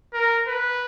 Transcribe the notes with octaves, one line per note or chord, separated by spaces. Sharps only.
A#4
B4